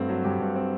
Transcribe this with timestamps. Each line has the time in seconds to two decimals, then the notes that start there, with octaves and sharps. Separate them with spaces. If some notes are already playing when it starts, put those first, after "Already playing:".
Already playing: G2 A3 C4 F#4
0.09 F#3
0.24 G2 G4
0.40 G2
0.56 C4